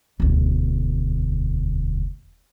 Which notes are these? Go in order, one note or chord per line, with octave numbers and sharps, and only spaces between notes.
E1 D2